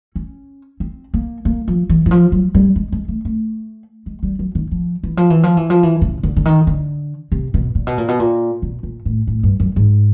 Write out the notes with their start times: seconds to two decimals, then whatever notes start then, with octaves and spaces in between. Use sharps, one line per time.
0.16 C#4
0.80 C4
1.14 A#3
1.45 A#3
1.68 F3
1.89 E3
2.06 E3
2.11 F3
2.32 F#3
2.55 G3
2.76 G#3
2.92 G#3
3.08 A3
3.25 A3
4.06 G#3
4.23 G3
4.39 F#3
4.55 D#3
4.71 F3
5.03 E3
5.17 F3
5.30 E3
5.43 F3
5.57 E3
5.70 F3
5.83 E3
6.02 C#3
6.23 D3
6.37 D3
6.45 D#3
6.67 D3
7.32 C3
7.54 B2
7.75 A#2
7.87 B2
7.98 A#2
8.08 B2
8.20 A#2
8.62 B2
8.83 A#2
9.06 A2
9.27 A2
9.43 G2
9.60 F#2
9.76 G#2